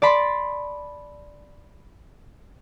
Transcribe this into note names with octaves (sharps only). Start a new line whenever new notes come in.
D5 A5 B5 C6